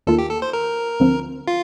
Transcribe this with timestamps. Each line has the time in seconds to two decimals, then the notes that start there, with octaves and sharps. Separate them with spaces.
0.07 D#2 D#3 A#3 F4 A4
0.18 G4
0.31 A4
0.42 C5
0.53 A#4
1.00 D2 D3 F3 C4
1.48 F4